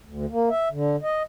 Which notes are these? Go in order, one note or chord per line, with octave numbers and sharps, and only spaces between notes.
D2
A#3
E5
D3
D#5